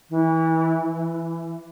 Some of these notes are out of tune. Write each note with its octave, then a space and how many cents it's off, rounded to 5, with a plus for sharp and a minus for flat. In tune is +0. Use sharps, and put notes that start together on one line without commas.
E3 -25
E3 +15